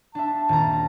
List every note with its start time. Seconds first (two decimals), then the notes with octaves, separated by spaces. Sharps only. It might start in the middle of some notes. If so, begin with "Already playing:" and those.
0.15 D4 E5 A5
0.49 D#1 A#5